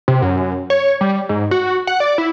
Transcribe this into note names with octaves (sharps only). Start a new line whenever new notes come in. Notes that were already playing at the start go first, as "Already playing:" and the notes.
C3
F#2
C#5
G3
G#2
F#4
F#5
D5
E4